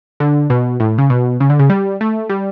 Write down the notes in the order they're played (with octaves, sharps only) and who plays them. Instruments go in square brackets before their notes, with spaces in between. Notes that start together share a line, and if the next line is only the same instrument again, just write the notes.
[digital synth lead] D3
B2
A2
C#3
B2
C#3
D3
C#3
G3
A3
G3